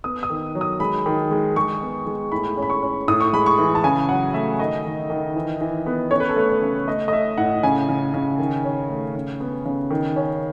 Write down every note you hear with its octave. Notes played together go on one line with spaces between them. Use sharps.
B3 D#6
D#6
D#3
F#3
D#6
G#3 B5
D#3
G#3
G#3 C#6
B3
G#3
A2 B5
C#4
B5
C#6
C#4
A2 D#6
C#6
G#3 B5
C#6
E3
A5
C#3 G#5
F#3 F#5
A3 E5
D#3 D#5
D#3
D#3
E3
E3
B3
C#4 C#5
B4
A4
A3 B4
C#5
C#3
A3 D#5
D#5
A3 E5
A2 F#5
C#3 G#5
C#3
C#3
D#3
C#4
A3
C#3
B3
C#3
D#3
C#4